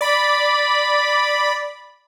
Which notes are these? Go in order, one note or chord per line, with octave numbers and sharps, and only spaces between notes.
D5 B5